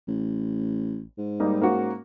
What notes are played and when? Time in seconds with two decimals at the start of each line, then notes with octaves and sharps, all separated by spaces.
0.08 A1
1.18 G#2
1.40 G3 A#3 D#4
1.62 A#3 C#4 F#4